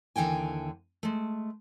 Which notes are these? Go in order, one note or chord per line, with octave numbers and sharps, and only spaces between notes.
D#2 D3 E3 G5 G#5
G#3 A3